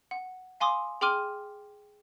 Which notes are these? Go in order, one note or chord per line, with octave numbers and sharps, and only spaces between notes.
F#5
F5 G#5 C6 D6 D#6
G#4 G5 C6 D6 F6 D#7